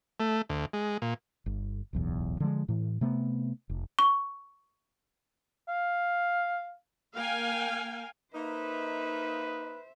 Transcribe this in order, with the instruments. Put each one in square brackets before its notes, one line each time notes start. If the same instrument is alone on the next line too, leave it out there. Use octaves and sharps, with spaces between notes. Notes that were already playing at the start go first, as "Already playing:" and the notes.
[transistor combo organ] A3
D2
G#3
A#2
[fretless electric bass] G1
D1 B1 E2
D3 F3 G#3
A2 E3
C3 A3 B3
F1
[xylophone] C#6
[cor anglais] F5
[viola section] A#3 F5 G5 G#5
[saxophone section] A#3 D#4 [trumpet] B4 [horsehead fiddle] C5 E5